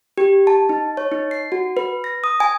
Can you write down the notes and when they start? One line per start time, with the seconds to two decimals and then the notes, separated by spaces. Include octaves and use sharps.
0.18 G4
0.47 A5
0.69 D#4
0.97 C#5
1.12 D#4
1.31 C7
1.52 F#4
1.77 B4
2.04 A#6
2.24 D#6
2.40 G#5